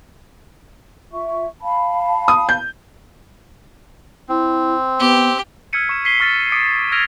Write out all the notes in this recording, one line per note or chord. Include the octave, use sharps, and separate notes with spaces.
F4 E5 C#6
F5 A5 B5
D#6
G6
C4 E4
B3 G4
E6 F6 G#6 B6 C#7 D#7
C#6 E7
B6 C7 D#7 G7
C#6 F6 A6
D6 D#6 B6 C#7 D7
E6 F6 G#6 A#6 D7 F7